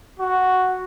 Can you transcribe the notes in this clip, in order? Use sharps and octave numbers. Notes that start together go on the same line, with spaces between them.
F#4